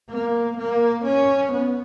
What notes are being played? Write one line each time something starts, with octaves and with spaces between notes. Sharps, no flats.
A#3
A#3
C#4
B3